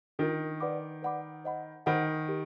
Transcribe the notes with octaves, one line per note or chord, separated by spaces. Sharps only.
D#3 D4 F4 A#4
B4 D5 F#5 B5 D6
B4 D5 F#5 B5 D6
C5 D#5 F#5 B5
D#3 C5 D#5 F#5 B5
G4 A#4